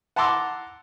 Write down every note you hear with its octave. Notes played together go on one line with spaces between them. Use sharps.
F#5 A5 A#5 C6 D6 E6